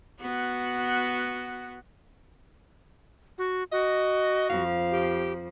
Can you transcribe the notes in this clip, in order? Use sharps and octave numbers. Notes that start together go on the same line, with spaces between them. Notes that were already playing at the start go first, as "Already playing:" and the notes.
B3 F#4
F#4
F#4 D#5
F2 F3 F5
G4